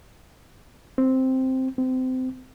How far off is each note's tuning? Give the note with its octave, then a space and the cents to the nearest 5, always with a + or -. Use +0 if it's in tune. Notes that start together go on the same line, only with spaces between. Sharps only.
C4 +0
C4 -25